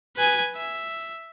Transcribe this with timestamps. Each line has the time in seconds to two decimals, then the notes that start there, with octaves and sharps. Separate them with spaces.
0.16 B4 G#5
0.56 E5